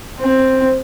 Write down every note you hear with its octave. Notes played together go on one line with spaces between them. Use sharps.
C4